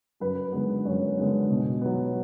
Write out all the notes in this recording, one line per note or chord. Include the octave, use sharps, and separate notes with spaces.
F#2 B4
D3 G#3 B3
F#2 C#5
D3 G#3 B3
B2
F#3 B3